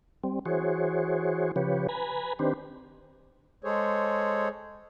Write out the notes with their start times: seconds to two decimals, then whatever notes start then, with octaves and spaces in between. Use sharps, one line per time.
0.24 G3 C4
0.46 E3 F#4 G#4 C5 C#5
1.56 C#3 F3 G4 B4 C#5
1.89 B4 G#5 A#5 B5
2.39 D#3 C4 D4 G4 B4 C5
3.63 G#3 G#4 A4 C5 C#5